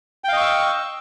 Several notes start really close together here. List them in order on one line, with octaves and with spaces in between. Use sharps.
G5 F5 D#5 C#6 E6